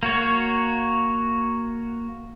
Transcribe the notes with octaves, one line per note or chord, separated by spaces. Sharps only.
A#3 F#4 C#5